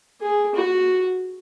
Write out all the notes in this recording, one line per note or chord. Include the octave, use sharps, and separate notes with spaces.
G#4
F#4